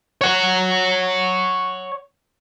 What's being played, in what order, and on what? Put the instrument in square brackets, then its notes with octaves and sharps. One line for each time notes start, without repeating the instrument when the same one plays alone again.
[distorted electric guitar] C#5 F#5